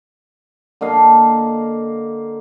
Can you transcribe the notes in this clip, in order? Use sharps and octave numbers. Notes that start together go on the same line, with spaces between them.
D3 A#3 D#5 F5